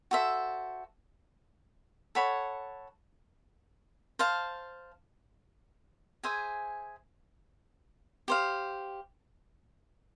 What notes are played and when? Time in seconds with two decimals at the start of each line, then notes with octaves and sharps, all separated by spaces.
0.11 F#4 A4 C5 E5
2.15 A4 C#5 F#5 B5
4.19 C5 F5 A5
6.23 G#4 C5 E5 G#5
8.28 G4 C5 F5